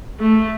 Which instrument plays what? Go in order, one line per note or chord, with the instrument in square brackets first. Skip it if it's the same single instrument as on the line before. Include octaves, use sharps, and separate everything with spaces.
[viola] A3